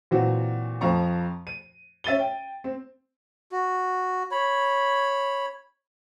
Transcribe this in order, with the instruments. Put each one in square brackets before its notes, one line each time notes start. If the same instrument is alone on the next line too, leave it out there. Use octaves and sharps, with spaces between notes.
[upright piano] A#2 E3 F#3 C4 F#4
F2 F3 A#5 C#6
D#7
C#4 E5 A6 D#7 G7
G5
C4
[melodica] F#4
C#5 B5